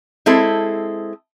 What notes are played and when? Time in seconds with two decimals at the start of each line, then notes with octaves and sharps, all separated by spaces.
0.26 G#3 C4 E4 A4